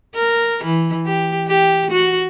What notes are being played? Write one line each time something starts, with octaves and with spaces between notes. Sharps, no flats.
A#4
E3
G4
G4
F#4